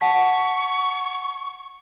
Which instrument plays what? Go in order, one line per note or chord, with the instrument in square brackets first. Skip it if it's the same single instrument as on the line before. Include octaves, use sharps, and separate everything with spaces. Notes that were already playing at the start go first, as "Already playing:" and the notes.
[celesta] F#5 A5 B6 [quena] C#6